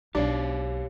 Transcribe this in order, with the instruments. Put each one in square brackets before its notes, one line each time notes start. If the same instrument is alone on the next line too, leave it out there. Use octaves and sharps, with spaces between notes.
[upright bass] B1 [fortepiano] D4 [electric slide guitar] G4 C#5 F5